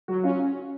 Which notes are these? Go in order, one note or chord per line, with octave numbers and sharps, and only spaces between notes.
F#3 F#4
C#4 F4